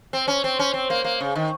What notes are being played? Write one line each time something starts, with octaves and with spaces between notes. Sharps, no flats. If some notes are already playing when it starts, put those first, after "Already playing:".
C4
C#4
C4
C#4
C4
A#3
A#3
C#3
D#3